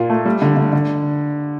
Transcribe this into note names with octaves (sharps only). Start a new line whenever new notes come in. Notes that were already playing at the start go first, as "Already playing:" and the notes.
Already playing: A#2 F4
A3
G3
D3
D3
D3